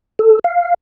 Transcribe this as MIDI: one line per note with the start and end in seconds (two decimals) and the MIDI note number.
0.19 0.39 69
0.44 0.74 77